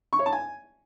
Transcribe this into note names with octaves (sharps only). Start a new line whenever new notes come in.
C#6
C#5
A5
G#5